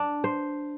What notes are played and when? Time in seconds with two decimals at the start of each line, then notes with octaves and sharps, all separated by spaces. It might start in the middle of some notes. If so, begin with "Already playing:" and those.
Already playing: D4
0.24 C5